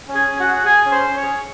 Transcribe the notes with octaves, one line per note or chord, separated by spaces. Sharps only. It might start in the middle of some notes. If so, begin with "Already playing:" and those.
C#4
G#4 G#5
C#4
F#4 F#5
G#4
G#4 G#5
C#4
C5 C6
C#4
C#5 C#6
G#4